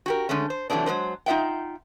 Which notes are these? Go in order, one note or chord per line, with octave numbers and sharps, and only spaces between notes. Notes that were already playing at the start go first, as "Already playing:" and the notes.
F#4 G4 A#4
D3 G#3 A3 C#4
C5
C3 E3 F#3 A3 C4 D4
F#3 G#3 B4 C5
D#4 F4 G#4 E5 F#5 G5